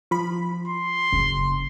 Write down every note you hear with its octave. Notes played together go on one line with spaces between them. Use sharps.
F3 B5
C6
F#1